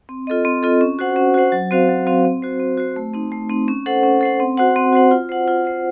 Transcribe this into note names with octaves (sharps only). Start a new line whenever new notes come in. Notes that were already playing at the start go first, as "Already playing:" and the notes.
C4
F4 A4 D#5
C4
F4 A4 D#5
C#4
F#4 C5 F#5
C#4
F#4 C5 F#5
F#3
C4 F#4 C5 F5
F#3
C4 F#4 C5 F5
C4
F#4 C5
C4
F#4 C5
A3
C4 D#4
A3
C4 D#4
C#4
A4 C5 F#5
C#4
A4 C5 F#5
C4
F#4 C5 F#5
C4
F#4 C5 F#5
F4
C5 F#5
F4
C5 F#5